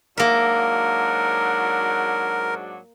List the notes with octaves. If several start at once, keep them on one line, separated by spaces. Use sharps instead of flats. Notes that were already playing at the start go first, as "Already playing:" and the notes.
G#2 F#3 A#3 D4 A#4 E5